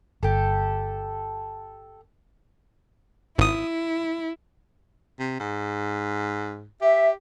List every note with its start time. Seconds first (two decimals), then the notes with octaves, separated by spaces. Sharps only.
0.23 G1 G4 A4
3.38 G#1 E4 D#6
5.19 C3
5.40 G#2
6.82 G4 E5